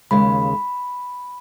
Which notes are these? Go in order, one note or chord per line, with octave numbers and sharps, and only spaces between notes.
D#2 C#3 G#3 B5